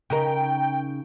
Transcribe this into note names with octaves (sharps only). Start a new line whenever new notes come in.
C#3 D#4 A#4 G5